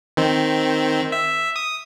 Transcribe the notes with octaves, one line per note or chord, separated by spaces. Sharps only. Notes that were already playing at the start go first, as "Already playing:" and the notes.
D#3 C4
E5
D#6